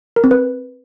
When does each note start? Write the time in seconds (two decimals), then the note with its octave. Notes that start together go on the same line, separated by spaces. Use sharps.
0.16 A#4
0.24 C4
0.31 B4